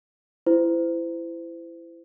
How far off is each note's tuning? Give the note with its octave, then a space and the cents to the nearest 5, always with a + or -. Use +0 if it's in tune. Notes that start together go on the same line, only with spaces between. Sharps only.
E4 +20 C5 -35